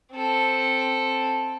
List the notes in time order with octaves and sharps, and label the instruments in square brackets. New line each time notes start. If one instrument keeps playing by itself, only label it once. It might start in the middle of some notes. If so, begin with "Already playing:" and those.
[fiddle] C4 A4